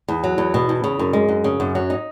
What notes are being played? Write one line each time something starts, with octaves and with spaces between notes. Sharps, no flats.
E2
F#3
E2
B2
E2
C#3
F#2
G#3
F#2
C#3
F#2
F#3
D#4